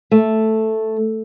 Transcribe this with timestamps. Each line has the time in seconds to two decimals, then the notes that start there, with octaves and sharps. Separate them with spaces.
0.11 A3